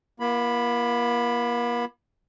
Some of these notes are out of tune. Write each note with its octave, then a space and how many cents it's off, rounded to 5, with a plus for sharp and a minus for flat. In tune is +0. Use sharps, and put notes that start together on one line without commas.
A#3 +40 F4 -40 B5 +0